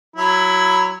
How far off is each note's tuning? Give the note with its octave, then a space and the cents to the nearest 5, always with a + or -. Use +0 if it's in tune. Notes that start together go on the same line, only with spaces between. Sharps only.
F#3 +5 E4 +10